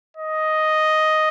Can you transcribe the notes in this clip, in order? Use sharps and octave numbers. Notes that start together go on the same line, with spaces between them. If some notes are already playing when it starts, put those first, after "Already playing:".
D#5